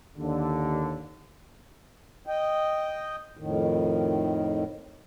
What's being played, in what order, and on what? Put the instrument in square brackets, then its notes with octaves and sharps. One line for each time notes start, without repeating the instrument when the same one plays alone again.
[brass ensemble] D#2 D3
[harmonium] D#5 G5
F2 A2 D#3